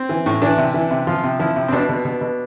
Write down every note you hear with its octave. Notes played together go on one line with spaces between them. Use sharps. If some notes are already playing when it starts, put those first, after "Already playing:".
Already playing: C4
E3
A2
E3 D4
C3
E3
C3
F3 F4
C3
F3 E4
C3
C4
B2 D4
B2
B2
B2